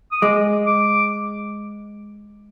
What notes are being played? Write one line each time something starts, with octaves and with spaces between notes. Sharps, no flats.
D#6
G#3 D6
D6